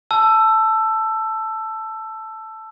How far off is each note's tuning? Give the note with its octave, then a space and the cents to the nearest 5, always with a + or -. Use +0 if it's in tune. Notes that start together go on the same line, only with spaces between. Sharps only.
A5 +0 E6 +15